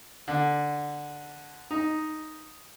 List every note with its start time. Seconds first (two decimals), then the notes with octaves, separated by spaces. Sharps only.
0.28 D3
1.71 D#4